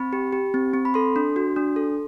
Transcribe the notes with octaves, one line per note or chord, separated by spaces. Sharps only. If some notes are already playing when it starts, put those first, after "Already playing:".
Already playing: C4 B5
G4
G4
C4
C4
B5
A4 C6
D4
F#4
D4
A4